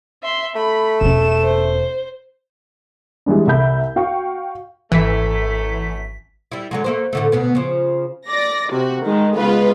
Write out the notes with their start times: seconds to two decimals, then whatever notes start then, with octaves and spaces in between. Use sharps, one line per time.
0.23 E5 C6
0.55 A3 B5
1.01 E1 C#4 E7
1.42 C5
3.26 E3 G3 G#3 D4
3.47 C2 E5 B5 G6
3.96 F#4 F5 G5 C#6
4.92 G#1 F#2 E3 A3 B6
6.52 G3 E4
6.71 D3 F#3 G#3
6.84 A3 A#3 C5
7.13 A2 D3 A3
7.32 D2 B2 B3
7.55 C#3 F3
8.28 D5 A#6
8.72 C3 F#4
9.03 D#3 G#3
9.37 C#3 G#3 B3 F4 B4